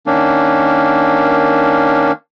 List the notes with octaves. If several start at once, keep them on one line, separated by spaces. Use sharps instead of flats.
D#3 A#3 C#4 D4